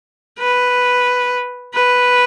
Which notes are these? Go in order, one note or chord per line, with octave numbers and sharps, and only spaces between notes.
B4
B4